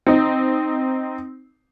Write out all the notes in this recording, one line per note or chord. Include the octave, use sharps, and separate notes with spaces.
C4 D#4